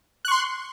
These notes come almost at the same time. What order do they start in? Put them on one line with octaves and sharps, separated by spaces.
F#6 C#6 C6